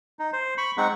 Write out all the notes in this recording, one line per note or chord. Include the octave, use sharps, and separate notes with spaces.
D#4
C5
B5 C#6
G#3 C4 D#4 F#5 C#6